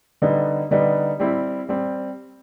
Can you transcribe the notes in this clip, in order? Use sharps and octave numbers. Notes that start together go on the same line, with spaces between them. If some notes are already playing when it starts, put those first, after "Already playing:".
D3 G3 B3 D#4
D3 G3 B3 D#4
G3 C4 E4
G3 C4